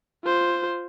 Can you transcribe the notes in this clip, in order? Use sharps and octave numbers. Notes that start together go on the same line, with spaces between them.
F4 C5